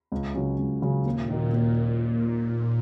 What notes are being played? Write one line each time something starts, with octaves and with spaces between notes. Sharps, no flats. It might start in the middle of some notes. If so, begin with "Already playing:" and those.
C#2
C#3 F#3 C#4
C#2
C#3 F#3 C#4
D#2 A#2
D#3 A#3 D#4 F#4
D#2